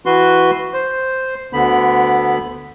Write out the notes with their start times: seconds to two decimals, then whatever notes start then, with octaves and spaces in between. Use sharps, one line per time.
0.06 E3 F#4 B4 C6
0.74 C5
1.53 D2 D3 B3 B5